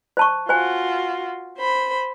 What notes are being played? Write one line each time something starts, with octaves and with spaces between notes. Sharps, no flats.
C5 A5 C#6
F4 F#4 C5 G#5
C5 B5